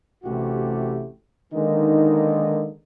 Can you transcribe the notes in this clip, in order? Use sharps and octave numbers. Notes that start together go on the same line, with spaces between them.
A1 C3 A3 E4 F#4 G4
D3 D#3 G#3 A#3 B3 D#4